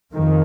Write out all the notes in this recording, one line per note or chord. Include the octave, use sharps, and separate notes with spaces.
F2 D#3